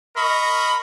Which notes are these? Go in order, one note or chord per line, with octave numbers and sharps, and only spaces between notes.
A#4 D#5 B5 C#6